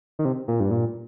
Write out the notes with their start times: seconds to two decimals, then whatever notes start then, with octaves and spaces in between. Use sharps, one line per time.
0.19 D#3
0.25 C3
0.48 A#2
0.60 G2
0.71 A#2